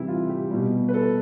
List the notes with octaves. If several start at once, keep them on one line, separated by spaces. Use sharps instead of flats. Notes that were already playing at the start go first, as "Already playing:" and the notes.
Already playing: C3 E3 G3 E4 G4
F4
G4
B2 G3
B4
A4